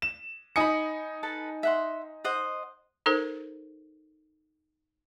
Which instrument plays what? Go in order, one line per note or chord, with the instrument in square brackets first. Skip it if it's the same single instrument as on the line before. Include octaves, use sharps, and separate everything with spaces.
[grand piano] E7
[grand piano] D#4 G#5 C#7 [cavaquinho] B5 D#6
[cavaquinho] A4 B4 A5
E5 F#5 C6
C5 D#5 F#5
[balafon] D#4 A4 A#4 C5